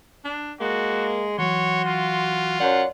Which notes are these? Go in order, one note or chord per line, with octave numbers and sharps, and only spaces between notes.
D4
G#3 A#3 F#4
E3 F#3 F#4 C#5 C6
F4
F#2 C#5 D5 F#5